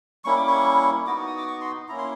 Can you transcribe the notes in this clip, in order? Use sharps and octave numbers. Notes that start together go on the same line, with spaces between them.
G3 A#3 C#4 E4 C#6
D6
C#6
B3 D#4 F#4 D6
D#6
D6
C#6
C6
A#3 C#4 E4 A#5
C6